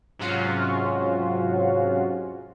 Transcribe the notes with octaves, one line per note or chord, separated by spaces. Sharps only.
G#2 C3 F#3 C#4 F4 F#4